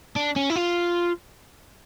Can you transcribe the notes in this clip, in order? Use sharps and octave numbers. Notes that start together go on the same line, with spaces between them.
D4
C#4
E4
F4